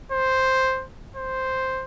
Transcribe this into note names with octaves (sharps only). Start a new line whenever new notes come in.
C5
C5